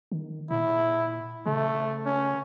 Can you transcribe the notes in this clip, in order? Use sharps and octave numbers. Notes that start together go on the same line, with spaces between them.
D#3
A#2 E4
C#3 A3
C#4